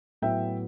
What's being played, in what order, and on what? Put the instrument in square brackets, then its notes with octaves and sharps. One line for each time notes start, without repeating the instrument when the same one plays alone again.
[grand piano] A2 F#3 B3 E5 G5